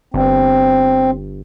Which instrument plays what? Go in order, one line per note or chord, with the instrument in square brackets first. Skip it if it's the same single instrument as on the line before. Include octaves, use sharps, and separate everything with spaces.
[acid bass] G1 [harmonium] C4